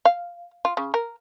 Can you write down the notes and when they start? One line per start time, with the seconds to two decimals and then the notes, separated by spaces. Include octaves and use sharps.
0.05 F5
0.65 F4
0.77 C#3
0.94 A#4